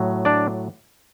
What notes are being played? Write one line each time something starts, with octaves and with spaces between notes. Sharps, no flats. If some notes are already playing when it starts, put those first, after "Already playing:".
Already playing: A2 F#3
D4 D5